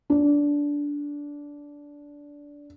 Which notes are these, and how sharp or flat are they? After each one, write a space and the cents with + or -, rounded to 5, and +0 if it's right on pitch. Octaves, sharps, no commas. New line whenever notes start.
D4 -15